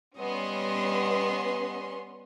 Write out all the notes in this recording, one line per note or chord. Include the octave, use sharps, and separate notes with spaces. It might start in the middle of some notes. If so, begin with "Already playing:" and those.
G3 B3 C#4 D#5 C6